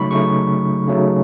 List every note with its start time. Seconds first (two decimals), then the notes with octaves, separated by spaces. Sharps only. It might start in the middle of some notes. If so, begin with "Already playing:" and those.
Already playing: C#3 F#3 A3 D#4 B5 C#6
0.11 C#3 F#3 A3 D#4 C#6
0.88 C#3 F#3 A3 D#4